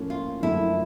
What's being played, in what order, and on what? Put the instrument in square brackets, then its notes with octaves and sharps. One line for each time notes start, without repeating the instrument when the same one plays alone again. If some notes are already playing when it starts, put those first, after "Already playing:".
Already playing: [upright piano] A2 F3 A#3 C#4
[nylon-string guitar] F4
[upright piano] F#1 F#2 D3 F3 A3 [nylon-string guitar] E4